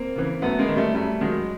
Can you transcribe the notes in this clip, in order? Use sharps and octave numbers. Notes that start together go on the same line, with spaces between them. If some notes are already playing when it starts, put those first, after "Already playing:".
Already playing: A#3 C4
C#3 E3
F#2 A3 B3
G#3 A#3
D#3
G3 A3
F#2 G3 A3
D#3 F#3 G#3